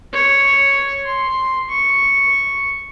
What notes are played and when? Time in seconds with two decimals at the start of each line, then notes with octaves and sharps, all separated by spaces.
0.12 C#5
1.05 C6
1.69 C#6